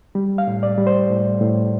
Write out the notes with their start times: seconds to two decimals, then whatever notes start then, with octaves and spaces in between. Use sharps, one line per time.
0.15 G3
0.38 F5
0.47 A2
0.63 D5
0.78 G3
0.87 C5
1.10 A2
1.41 A2